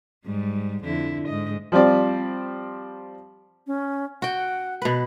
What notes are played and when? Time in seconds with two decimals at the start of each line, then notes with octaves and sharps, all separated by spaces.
0.25 G#2 G3
0.84 F2 D3 E4
1.28 G#2 D#5
1.72 F3 G3 C4 D5
3.67 C#4
4.22 F#4 F#5 G5
4.82 B2 B4